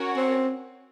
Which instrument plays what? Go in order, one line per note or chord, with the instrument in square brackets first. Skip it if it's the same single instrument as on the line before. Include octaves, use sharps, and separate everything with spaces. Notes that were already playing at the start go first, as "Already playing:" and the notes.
Already playing: [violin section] C#4 F#4 A#4 C#5 F#5
[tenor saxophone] C4